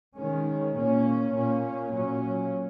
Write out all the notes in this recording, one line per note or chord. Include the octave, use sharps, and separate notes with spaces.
D#3 G#3 C#4
A#2 A#3 C#4
A#2 A#3 C#4
A#2 F#3 C#4